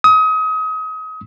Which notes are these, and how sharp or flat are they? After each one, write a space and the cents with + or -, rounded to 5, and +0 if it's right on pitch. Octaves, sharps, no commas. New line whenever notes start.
D#6 +30